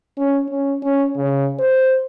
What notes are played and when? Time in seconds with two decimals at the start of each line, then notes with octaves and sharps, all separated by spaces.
0.18 C#4
0.49 C#4
0.83 C#4
1.16 C#3
1.59 C5